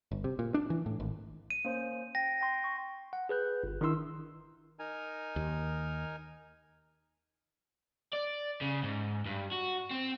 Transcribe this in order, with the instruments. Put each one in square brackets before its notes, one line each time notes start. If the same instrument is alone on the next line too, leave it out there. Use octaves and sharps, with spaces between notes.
[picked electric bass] G1
C3
A#2
D4
E3
A2
G#1
[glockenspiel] D#7
[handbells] A#3 C#4 C5
[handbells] G5 [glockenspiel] A#6
[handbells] G5 C6
C#6
[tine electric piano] F#5
G#4 B4 F#6 G6
G1
D#3 D4 E4 C6 E6
[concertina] D#4 A#4 G#5
[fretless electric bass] D#2
[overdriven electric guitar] D5
C#3
G#2
G2
F#4
C4